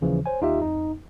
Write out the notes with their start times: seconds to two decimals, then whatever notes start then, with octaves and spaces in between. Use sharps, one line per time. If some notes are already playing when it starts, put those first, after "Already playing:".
0.01 D#2 C#3 E3 F3
0.26 C5 C#5 G#5
0.41 D#2 D#4 F4 G4 E5
0.60 F2 D#4